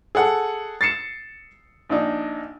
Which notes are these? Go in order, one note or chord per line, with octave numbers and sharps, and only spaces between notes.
G#4 A4 F#5
A6 C7 C#7 E7
A#1 D4 D#4